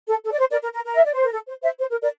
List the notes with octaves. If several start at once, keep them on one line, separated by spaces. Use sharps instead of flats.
A4
A4
D5
C5
A#4 D5
A#4
A#4
A#4
E5
D5
C5
A#4
A4
C5
C5 E5
C5
A#4
A#4 D5